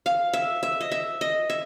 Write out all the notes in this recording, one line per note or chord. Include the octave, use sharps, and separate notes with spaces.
F5
E5
E5
D#5
E5
D#5
E5